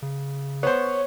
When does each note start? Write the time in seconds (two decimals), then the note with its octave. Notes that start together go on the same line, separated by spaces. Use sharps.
0.02 C#3
0.63 B3 C5 C#5